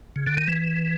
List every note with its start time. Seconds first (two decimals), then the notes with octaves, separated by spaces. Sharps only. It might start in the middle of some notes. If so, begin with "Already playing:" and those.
0.16 C#3
0.27 D3
0.37 D#3
0.48 E3